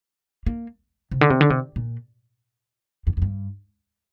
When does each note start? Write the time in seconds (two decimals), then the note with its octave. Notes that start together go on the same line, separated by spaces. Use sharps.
0.46 A#3
1.11 C3
1.21 D3
1.30 C3
1.41 D3
1.50 C3
1.76 A#2
3.07 F2
3.17 F2
3.22 G2